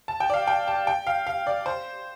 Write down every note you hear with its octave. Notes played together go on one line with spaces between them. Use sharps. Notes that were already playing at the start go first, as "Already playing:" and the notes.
A5
G5
D5
F5
G5
A5
G5
F5
F5
D5
C5